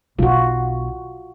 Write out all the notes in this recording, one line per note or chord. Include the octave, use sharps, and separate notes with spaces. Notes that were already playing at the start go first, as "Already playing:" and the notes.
B1 D#3 F4 F#4